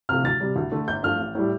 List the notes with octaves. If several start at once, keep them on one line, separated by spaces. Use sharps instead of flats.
C3 F3 A3 F6
D2 A6
C3 G3
D2
D3 A3
G1 G6
G2 F3 A3 F6
A1
A2 G3